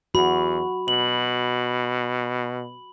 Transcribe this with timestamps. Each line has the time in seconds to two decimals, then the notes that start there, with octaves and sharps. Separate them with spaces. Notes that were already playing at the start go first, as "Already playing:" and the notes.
0.15 E2 F#4 B5
0.88 B2 F#7